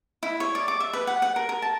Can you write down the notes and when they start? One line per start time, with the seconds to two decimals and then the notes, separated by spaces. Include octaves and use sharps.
0.23 E4
0.40 C#5
0.55 D5
0.68 D6
0.80 E5
0.93 B4
1.07 F#5
1.22 F#5
1.36 A#4
1.49 A#4
1.62 A5